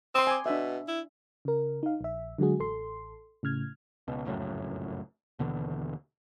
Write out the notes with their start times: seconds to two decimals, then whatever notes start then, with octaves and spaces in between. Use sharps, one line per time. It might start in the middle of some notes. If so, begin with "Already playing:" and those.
0.15 C4 C6 D#6
0.27 G#5 D6
0.46 B2 D4 E5
0.88 E4
1.45 C#3 A#4
1.83 D#4 F5
2.01 A#1 E5
2.38 D3 F#3 G#3 F#4 G#4
2.59 A1 A4 C6
3.43 A2 C#3 F6 G#6
4.08 C#2 B2
4.25 F1 C#2 F#2 A2
5.39 D#2 B2 D3 E3